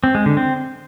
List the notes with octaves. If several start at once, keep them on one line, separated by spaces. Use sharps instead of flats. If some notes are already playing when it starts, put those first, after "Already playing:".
C4
G#3
D3
C4